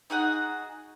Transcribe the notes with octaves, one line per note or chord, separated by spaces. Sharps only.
D#4 F#4 G#4 F#5